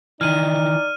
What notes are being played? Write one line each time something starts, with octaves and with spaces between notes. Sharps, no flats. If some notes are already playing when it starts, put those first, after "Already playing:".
D#3 E3 D#4 D5 F6 D#7